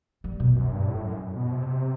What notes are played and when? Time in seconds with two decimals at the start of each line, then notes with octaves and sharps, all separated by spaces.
0.24 G3
0.40 B2
0.56 F#2
0.72 G2
0.88 A2
1.04 F#2
1.36 B2
1.52 C3